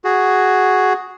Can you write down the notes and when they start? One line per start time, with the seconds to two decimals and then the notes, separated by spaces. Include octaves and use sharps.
0.04 F#4 G#4